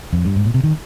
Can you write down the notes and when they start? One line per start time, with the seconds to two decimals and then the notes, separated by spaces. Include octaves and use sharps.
0.13 F2
0.25 G2
0.36 G#2
0.45 A#2
0.54 C3
0.64 D#3